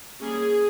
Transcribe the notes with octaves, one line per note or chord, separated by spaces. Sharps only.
G3 A#3 C#4 G#4